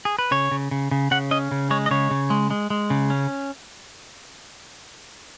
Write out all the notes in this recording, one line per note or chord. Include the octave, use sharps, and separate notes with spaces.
G#4
B4
C#3 C#5
C#3
C#3
C#3
C#3 F#5
C#4 D#5
C#3
G#3 C#5
D#5
C#3 C#5
C#3
G#3
G#3
G#3
C#3
C#4